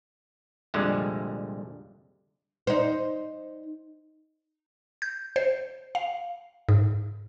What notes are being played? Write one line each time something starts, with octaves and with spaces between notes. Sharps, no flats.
C2 F2 A#2 D3 G3 G#3
D#4 C5
G6
C5
F5
G#2